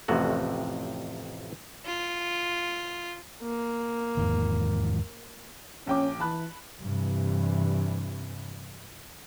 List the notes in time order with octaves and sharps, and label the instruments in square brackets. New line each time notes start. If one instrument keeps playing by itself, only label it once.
[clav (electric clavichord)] A1 F2 A2 C3 F#4
[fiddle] F4
[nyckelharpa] A#3
[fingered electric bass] E2 G#2 D#3
[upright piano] A#1 G5 D6 [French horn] C#4
[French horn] E3 [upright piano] A5 B5 F#6
[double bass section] G2 C3 E3